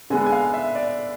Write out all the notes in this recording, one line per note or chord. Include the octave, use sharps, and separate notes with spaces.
D3 G#3 B3 G#5
G#5
F5
E5
D5